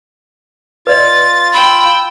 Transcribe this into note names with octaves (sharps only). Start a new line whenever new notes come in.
F4 B4 D5 D#5 A6
G5 B5 E6